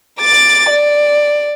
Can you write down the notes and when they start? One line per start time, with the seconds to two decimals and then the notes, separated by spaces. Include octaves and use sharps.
0.20 D6 A6
0.69 D5